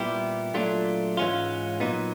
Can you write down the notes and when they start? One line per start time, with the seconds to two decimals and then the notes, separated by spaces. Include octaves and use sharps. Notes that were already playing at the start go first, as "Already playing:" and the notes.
Already playing: A#2 G3 B3 E4 G4
0.54 A#2 F#3 A3 D4 F4
1.17 G#2 E3 G#3 C#4 F4
1.80 A#2 F#3 B3 D#4